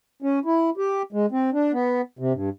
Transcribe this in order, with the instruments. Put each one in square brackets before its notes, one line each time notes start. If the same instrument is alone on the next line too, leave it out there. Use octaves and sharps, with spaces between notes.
[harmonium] C#4
E4
G4
G#3
C4
D4
B3
C3
G2